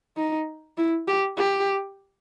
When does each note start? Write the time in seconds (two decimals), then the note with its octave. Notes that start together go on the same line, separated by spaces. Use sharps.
0.17 D#4
0.78 E4
1.08 G4
1.38 G4